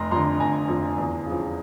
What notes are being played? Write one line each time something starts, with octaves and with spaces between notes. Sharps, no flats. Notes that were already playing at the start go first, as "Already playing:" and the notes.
Already playing: F1 A#5 C6
F2 D3 A#5 C6
F1 G#5 A#5
F2 D3
E2
C#3 F3